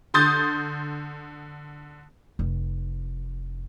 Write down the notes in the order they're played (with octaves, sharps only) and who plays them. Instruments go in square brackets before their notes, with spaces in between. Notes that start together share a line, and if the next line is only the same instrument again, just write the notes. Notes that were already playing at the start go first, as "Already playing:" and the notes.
[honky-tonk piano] D3 C6 D#6 G6 A6
[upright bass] F1